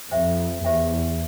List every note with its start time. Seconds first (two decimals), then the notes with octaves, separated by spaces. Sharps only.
0.11 F2 G4 C5 E5 G5
0.64 E2 G4 C5 E5 G5